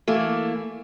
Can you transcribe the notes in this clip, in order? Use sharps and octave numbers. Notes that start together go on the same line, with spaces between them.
E3 A3 A#3